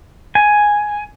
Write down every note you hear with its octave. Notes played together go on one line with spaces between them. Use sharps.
G#5